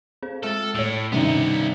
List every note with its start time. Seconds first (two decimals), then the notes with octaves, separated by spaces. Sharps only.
0.22 C4 G#4 C5
0.43 G#3 A4 E5 A5 F6
0.75 A2 C#5 E6 D7
1.12 G2 C3 D#3 B3 C#4 D#4 E5
1.54 B6